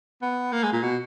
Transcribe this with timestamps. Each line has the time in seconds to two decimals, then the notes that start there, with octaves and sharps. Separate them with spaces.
0.22 B3
0.52 A#3
0.63 G#3
0.73 A#2
0.83 B2